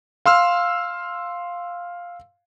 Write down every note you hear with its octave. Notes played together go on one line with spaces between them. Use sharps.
F5 C6 E6 F6